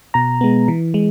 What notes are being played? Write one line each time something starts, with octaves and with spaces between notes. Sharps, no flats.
B2 A#5
G#3 B3
E3
G#3